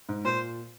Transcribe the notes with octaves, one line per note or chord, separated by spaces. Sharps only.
G#2
A#2 C5